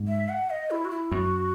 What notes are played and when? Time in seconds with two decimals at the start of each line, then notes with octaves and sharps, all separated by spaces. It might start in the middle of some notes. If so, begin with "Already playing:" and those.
Already playing: G#2
0.08 E5
0.29 F#5
0.50 D#5
0.71 E4
0.85 F#4
0.90 E4
1.12 F#2 F#4